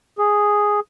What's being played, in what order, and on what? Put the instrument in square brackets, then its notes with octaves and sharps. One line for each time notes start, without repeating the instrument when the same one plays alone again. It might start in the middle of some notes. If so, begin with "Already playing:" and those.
[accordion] G#4